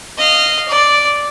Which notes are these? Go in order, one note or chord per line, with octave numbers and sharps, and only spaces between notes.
D#5 F5
D5